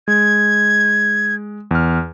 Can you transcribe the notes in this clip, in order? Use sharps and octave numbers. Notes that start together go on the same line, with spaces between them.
G#3 G#6
E2 F6